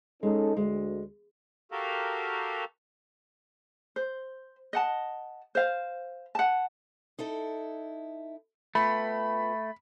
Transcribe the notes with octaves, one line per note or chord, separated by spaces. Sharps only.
G#3 C#4 D#4 A4
D2 G#3
F#4 G4 A4 A#4 F5
C5
D#5 F#5 A5
C5 F5
F#5 A5
D#4 E4 A4
A3 B3 F4 G5 B5